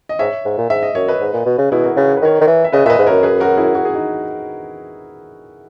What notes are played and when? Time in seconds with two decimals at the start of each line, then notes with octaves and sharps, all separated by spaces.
0.09 D#5
0.19 G#2 C#5 E5
0.45 G#2
0.58 A#2
0.70 G#2 E5
0.83 D#5
0.95 F#2 C#5
1.08 B4 D#5
1.21 G#2
1.33 A#2
1.46 B2
1.58 C#3
1.72 B2 E4 G#4
1.84 F#4 A#4
1.96 C#3 G#4 B4
2.09 C#5
2.17 B4
2.22 D#3 A#4 C#5
2.41 D#3
2.47 E3
2.64 E5
2.72 C#3 B4 D#5
2.85 A#2 E5
2.90 B4 D#5
2.98 G#2
3.06 F#2 A#4 C#5
3.23 G#4 B4
3.40 F#4 A#4
3.57 E4 G#4
3.75 F#4
3.85 G#4
3.95 D#4 F#4